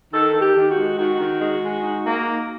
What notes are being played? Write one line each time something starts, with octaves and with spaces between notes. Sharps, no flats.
D#3 A4
D#3
G4
D#3
F#4
G#3
D#3 F#4
D#3
G#3
G#3
D#4
A#3
D#4